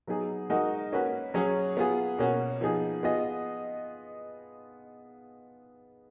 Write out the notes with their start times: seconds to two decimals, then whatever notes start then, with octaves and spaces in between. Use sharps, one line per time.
0.07 F#3 B3 D#4 G#4
0.50 G#3 D#4 F#4 A#4 D#5
0.92 A#3 C#4 F#4 B4
1.34 F#3 C#4 G#4 C#5
1.77 B3 F4 G#4
2.19 B2 A#3 C#4 F#4
2.61 F3 B3 D#4 G#4
3.03 B3 F4 G#4 D#5